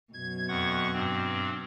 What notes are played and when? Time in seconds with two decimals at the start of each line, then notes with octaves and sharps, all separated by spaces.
0.13 F#2 B2 G#6
0.48 F2 F#5 C#6
0.93 G2 C4